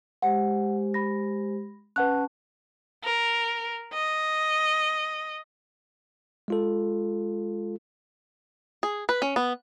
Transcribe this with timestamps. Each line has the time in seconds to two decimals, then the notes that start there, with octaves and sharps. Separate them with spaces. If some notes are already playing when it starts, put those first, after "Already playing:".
0.22 G#3 G4 C5 F#5
0.94 B5 A#6
1.96 C#4 B4 F#5 A5 F#6
3.04 A#4
3.93 D#5
6.48 G#3 F4 A4
8.83 G#4
9.09 B4
9.22 C#4
9.36 B3